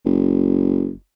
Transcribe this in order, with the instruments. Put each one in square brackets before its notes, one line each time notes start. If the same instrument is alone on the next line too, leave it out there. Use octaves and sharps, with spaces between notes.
[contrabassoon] F#1